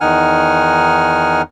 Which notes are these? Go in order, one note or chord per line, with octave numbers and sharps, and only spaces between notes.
E2 D#3 D#4 F#5 G#5 F6